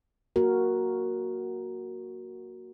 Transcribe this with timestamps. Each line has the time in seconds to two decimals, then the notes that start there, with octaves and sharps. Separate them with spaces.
0.36 A#3 F#4 A#4